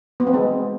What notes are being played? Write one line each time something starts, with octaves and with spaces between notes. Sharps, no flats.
B3
C4
G#3